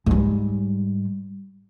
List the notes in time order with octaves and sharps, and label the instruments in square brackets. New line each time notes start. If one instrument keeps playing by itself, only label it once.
[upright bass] G#2 G3